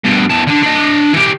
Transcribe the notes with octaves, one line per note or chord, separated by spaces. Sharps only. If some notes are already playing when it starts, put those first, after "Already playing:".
G2 B2
E2 A5
D3 D4
D4 D#5
E3 G4